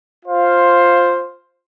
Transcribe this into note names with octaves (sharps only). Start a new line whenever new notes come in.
F4 C5 F5